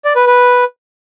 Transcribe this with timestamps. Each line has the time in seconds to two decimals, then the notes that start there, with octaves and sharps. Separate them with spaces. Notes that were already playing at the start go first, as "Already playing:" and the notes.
0.05 D5
0.16 B4
0.27 B4